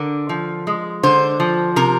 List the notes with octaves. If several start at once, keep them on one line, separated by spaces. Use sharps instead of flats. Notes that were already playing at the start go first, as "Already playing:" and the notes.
Already playing: D3 A#4
F3
G#3
D3 C5
F3
C3 A#4